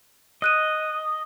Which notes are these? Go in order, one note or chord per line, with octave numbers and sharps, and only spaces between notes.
D#5 D#6 F#6 D#7